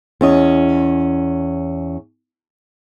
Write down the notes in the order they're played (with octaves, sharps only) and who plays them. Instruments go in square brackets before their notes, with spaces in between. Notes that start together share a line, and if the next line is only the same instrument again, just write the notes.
[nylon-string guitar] E2 C#4 D#5